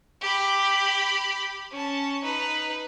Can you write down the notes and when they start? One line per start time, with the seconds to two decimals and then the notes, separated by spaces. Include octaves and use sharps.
0.21 G4 B5
1.71 C#4 A5
2.24 D#4 B4